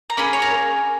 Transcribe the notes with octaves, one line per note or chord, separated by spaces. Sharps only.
A#5
A#3 C#4 G#4 B5
C#5
A#4